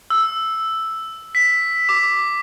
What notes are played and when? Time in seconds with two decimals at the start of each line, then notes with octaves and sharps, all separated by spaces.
0.10 E6
1.35 B6
1.89 D6